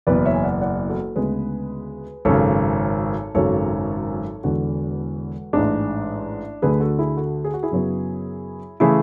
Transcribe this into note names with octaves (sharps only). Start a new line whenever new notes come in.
F#1 E2 B2 B4 D5
C#5 E5
G#5
D5 F#5
D5 F#5
F#4 A4
D2 C#3 G#3 B3 G#4 B4
G#1 F#2 C#3 A4 C#5
G#1 F#2 C#3 F#3 A4 C#5
E1 E2 D3 F#4 A4
A1 G#2 G#3 D4
D2 D3 A3 G#4 B4
F#4 A4
E4 G#4
F#4 A4
G#4
F#4
E4 G#4
F#2 C#3 F#3 B3
C#3 E3 A3 E4 G#4